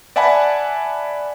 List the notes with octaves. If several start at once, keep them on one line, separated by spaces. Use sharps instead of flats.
D5 E5 F#5 G#5 A5 B5